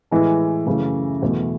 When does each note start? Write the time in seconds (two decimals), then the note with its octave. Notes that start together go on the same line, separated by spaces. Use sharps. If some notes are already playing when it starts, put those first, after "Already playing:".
0.11 A2 E3 G#3
0.66 F#2 C#3 E3 A3
1.22 E2 B2 F#3 A3